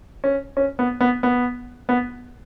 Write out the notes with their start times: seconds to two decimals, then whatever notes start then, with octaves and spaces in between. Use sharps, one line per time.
0.24 C#4
0.57 C#4
0.79 B3
1.01 B3
1.23 B3
1.89 B3